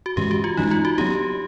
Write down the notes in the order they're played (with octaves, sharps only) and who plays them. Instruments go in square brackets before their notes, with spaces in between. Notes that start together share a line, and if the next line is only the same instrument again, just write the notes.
[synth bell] F#4
[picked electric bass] G2 E3 G#3 C#4 [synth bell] G4
[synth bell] F#4
F4
[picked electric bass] G2 E3 G#3 C#4 [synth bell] D#4
[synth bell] F4
F#4
[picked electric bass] F#3 B3 D4 [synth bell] G4